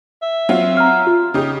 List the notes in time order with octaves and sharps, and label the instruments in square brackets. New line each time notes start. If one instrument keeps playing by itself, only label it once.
[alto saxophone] E5
[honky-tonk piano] F#3 F4 [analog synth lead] C4
[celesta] A#5 F6
[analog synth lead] F4
[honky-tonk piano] C#3 G4 [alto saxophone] D#4 [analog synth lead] D#6